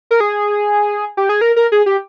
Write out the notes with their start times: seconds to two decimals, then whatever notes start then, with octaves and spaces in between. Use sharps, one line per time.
0.11 A#4
0.20 G#4
1.17 G4
1.29 G#4
1.41 A#4
1.56 A#4
1.72 G#4
1.86 G4